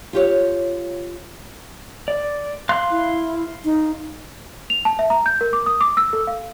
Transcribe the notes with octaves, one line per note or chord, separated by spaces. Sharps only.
F4 G4 C#5
D5
F5 C6 F#6
E4
D#4
F7
A5
E5
A#5
G6
A#4
D6
D#6
D6
E6
A4
F5